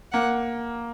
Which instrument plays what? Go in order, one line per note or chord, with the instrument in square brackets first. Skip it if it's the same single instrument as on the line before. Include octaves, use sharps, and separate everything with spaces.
[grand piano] A#3 [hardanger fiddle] F#5